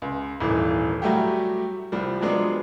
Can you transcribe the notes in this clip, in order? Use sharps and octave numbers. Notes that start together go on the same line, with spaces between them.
C#2
D#1 G#1 E3
F#3 G3 A3 F#4 G4
C2 F3 G3
F3 F#3 G#3 B3 D4 F4